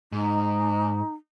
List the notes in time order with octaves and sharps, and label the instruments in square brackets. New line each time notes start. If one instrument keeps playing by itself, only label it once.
[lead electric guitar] G#2 [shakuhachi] D#4